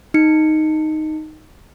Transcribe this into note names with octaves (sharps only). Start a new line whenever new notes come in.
D#4 C#7